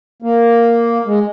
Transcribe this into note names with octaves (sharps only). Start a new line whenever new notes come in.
A#3
G#3